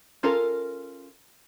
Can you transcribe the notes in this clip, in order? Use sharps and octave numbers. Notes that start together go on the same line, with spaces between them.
C#4 F4 A4 A#4